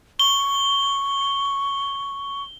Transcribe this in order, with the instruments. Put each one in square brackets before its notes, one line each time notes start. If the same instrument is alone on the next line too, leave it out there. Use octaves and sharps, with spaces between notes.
[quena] C#6 [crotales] G7